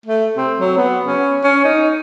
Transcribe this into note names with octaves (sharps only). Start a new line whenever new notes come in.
A3
C4
F#3
B3
C#4
C#4
D#4